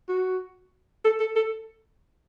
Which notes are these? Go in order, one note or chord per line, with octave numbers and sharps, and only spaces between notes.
F#4
A4
A4
A4